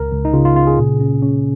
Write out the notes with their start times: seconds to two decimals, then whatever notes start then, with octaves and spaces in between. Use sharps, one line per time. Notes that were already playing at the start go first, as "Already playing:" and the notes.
Already playing: C#2 A#4
0.11 C#2
0.25 D#4
0.33 C#3 F4
0.45 F4
0.56 C#3 F4
0.67 G#4
0.78 A#2
1.00 C#4
1.22 C#4